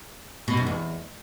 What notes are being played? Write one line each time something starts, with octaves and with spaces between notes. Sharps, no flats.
B2
F#2
E2